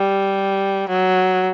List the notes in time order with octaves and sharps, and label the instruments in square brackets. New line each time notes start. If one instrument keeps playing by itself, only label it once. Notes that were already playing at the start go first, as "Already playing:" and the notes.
Already playing: [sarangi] G3
F#3